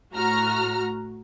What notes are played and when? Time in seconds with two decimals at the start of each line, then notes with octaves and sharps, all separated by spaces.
0.13 A2 F#4 A#5 F6